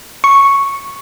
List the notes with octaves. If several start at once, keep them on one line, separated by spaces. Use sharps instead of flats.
C#6